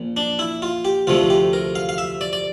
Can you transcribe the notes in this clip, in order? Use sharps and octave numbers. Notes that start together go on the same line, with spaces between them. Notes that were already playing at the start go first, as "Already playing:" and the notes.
Already playing: A#1 A#2
D4
E4
F4
G4
D2 C3 F3 A3 F4
G4
A#4
F5
F5
E5
D5
D5